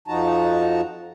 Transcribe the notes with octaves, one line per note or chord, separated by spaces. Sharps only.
F2 F3 D#4 F#4 A5 A#5